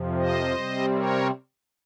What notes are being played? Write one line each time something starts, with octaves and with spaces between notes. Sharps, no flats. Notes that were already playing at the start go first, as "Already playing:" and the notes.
Already playing: F2 C3 F3
C5 D#5
C3 G3 C4
A#4 C#5